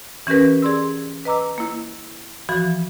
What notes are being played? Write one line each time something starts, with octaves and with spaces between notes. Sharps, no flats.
E3 C#4 G4 A#4 B4
G#4 D5 C6 E6
B4 D#5 A#5 D6 E6
A#3 E4
E3 F3 F#4 B5